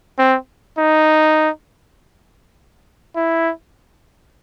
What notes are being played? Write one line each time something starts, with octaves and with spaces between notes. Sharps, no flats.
C4
D#4
E4